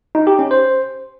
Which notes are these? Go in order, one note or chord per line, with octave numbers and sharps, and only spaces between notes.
D#4
G4
C#4
C5